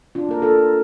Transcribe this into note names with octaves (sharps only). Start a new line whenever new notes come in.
D4 F4
A#3 A#4
F4 A4